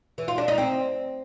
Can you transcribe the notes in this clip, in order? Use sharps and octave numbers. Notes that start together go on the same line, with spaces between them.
E3
F4
D4
D#4
C4